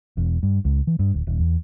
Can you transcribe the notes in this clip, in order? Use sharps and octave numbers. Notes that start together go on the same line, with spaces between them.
E1
G2
C#2
E3
G2
D1
D#1
E2